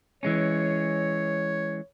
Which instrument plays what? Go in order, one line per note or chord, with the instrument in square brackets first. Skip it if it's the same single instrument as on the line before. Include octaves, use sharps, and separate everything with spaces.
[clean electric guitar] E3 G#3 C#4 [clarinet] C#5